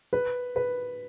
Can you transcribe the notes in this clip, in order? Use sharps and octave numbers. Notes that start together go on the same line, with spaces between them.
B4
B4